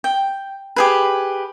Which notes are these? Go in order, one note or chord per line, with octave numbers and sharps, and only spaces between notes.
G5
G4 G#4 B4